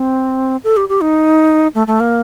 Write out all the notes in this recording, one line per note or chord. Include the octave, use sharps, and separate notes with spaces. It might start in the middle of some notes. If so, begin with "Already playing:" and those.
Already playing: C4
A4
G4
G4
D#4
A3
A3
A#3